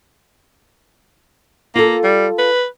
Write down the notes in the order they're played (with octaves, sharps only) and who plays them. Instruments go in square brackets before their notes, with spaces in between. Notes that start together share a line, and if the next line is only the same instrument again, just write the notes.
[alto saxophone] A#3 [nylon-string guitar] F4 A4
[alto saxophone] G3
B4